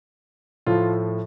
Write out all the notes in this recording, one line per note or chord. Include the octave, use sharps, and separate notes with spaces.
A2 F3 A3 F4